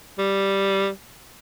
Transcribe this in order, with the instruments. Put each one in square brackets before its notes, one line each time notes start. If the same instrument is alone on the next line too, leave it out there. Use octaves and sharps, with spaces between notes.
[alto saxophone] G3